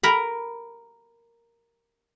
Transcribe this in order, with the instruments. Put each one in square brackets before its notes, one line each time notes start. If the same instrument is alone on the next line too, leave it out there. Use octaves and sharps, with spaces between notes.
[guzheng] A#4 A#5 B5